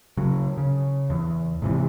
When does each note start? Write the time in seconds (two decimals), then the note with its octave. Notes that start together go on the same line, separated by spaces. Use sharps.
0.17 C#3 F#3
0.57 C#3
1.10 E2
1.62 G#2 C3 E3